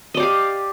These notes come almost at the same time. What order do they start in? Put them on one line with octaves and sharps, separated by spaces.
D#5 D5 G4 F5